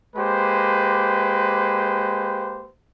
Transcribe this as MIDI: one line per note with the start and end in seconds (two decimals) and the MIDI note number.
0.16 2.69 56
0.16 2.69 58
0.16 2.69 67
0.16 2.69 71
0.16 2.69 72